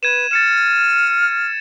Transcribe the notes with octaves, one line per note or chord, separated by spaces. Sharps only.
B4 G#6 D#7 E7
F6 A6 C#7 E7